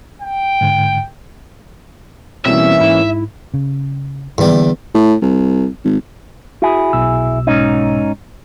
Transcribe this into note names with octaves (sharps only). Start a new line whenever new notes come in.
G5
G#2 D3
B2 E3 G3 A#3 C4 C#4 E4 E5
G#2 E4
C#3
E2 G#2 D3 D#3 G3
D3 A#3
A2
C2
G#1
E4 F#4 G#4
B1 B2 E6
G#2 C#4 D#4